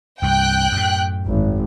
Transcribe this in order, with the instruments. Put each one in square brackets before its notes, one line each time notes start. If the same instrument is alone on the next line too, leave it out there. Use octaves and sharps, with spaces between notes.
[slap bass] C2 G2 [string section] G5 F#6
[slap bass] F#2 A2
[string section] G#1